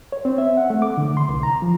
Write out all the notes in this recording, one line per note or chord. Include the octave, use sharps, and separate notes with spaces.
C#5
C4
E5
F#5
A3
D6
D3
C6
C2
A#5
F3